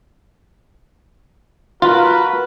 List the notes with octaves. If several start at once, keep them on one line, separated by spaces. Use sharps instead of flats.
F4 F#4 A#4 B4